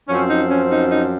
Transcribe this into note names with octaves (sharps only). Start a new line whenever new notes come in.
F#2 F3 C4 C#4
D#4
C#4
D#4
D#4